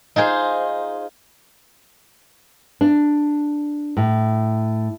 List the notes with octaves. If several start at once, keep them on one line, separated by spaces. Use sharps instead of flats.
D#4 F4 G#4 C5
D4
A2